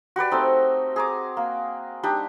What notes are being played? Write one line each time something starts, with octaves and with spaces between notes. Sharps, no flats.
F#4 G4 B4 D5
A3 C4 D#4
G#4 A#5 D6
A#3
G3 D4 D#4 G4